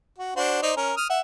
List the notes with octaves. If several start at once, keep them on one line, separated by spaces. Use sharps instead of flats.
F#4
D4 F#4 C5
D#4 C5 D5
C#4 A#4
D#6 F6
E5 F#5